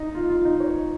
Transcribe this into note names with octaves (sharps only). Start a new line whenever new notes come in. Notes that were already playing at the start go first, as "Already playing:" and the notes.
Already playing: D#4
F4
F4
D#4
C#5